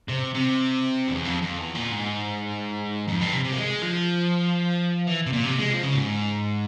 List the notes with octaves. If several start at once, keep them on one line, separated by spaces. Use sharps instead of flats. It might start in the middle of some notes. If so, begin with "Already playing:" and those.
C3
C3
E2
F2
F2
E2
A#2
G#2
F2
G2
C3
C3
A#3
G#3
F3
E3
C3
A#2
C3
G#3
F3
C#3
G#2